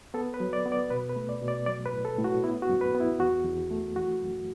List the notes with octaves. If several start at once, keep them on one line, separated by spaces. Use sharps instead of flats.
B3 A4
B4
F#3
D5
B3
D5
B2 B4
B4
A3
D5
B2
D5
F#3 D5
B4
A2
A4
A2
F#4
B3 E4
F#4
F#2
B4
B3
E4
E2 F#4
E2
A3
E3 F#4
F#2